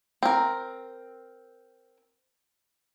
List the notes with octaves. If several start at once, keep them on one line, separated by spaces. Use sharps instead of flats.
C4 A#4